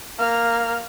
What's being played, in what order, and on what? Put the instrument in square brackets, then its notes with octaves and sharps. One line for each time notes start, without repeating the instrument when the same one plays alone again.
[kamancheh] A#3 F6